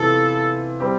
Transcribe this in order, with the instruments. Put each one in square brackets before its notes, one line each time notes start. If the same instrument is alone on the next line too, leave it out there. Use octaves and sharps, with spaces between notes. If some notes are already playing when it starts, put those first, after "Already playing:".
Already playing: [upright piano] C3 E3 B3 F4 [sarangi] A4
[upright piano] G3 C4 G4